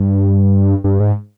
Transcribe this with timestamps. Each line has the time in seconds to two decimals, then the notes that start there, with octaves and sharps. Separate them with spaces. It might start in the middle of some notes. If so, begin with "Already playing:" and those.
Already playing: G2
0.84 G2
1.00 G#2